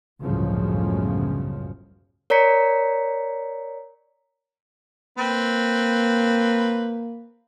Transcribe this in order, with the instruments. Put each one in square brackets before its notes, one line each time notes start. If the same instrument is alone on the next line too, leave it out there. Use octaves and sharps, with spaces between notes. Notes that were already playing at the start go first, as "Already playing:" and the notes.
[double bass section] G1 C#2 F#2 A2 C#3 F3
[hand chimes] A#4 C#5 D5 A#5 B6 C#7
[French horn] A#3 [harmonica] C4 B4